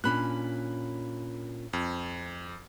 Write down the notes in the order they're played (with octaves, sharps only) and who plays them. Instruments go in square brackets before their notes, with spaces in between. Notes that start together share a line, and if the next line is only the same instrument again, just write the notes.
[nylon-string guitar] A#2 C#4 D4 [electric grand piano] B5 F#6
[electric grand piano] F2